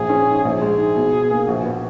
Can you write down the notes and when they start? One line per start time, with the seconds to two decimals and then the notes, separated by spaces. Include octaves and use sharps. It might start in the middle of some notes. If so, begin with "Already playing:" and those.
Already playing: A#1 G#2 G#4
0.09 C#4
0.28 G#2
0.44 A#1 G#4
0.61 G#3
0.78 G#2
0.96 B2
1.12 B2
1.30 A#3
1.48 A#1 F#4
1.64 B3